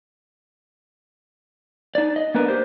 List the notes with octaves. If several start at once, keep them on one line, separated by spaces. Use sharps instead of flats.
D#4 D5
D#5
A#3 B3 D4 A#4 B4
G4 C5